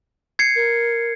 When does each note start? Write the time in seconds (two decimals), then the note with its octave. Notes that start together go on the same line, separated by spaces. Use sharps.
0.39 G#6 C7 C#7
0.56 A#4